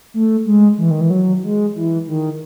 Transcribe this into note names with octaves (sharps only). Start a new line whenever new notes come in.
A3
G#3
E3
D#3
E3
F#3
G#3
E3
D#3